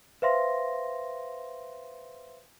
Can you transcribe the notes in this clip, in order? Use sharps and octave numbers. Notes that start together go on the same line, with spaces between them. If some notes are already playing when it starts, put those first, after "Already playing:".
B4 C5 E5 F5 C6 A#6